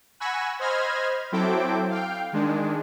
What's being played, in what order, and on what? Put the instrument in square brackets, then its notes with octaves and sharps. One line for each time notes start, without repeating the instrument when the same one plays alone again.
[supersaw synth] F#5 G#5 B5 C#6 E6 A#6
C5 D#5 B5 F6 G#6 A#6
F#3 C4 E4 A4 G5 D6
F5 G5
D#3 G#3 D4